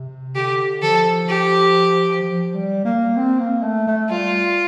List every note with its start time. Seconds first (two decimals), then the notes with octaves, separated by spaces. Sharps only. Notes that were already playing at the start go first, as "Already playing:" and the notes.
Already playing: C3
0.35 D3 G4
0.82 F3 A4
1.29 G4
2.22 F3
2.54 G3
2.84 A#3
3.16 C4
3.39 A#3
3.62 A3
3.87 A3
4.10 G3 F4